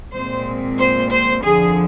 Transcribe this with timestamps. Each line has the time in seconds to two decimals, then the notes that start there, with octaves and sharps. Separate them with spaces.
0.12 A#2 G#3 C4 C5
0.78 C5
1.10 C5
1.44 F2 D3 F3 G#4